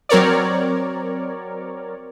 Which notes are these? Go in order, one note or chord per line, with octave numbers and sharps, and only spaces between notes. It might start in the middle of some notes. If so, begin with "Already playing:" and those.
F#3 C4 A#4 C#5 D5